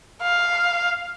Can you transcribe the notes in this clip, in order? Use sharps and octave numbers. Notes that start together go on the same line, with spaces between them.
F5